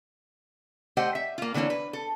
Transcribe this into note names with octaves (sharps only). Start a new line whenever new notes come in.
A3 G4 C5 D#5 F#5 G5
E5
A#3 F4
D3 E3 A#3 C4 C#4
B4
A4